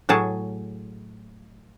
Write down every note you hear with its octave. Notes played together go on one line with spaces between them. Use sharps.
A2 F#3 G#4 A5